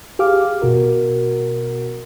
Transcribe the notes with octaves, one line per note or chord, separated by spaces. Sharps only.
G4 G#4 F5 D6 F6
B2 F#4 A#4